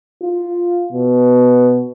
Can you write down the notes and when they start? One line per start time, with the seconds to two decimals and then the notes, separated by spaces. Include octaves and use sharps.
0.23 F4
0.93 B2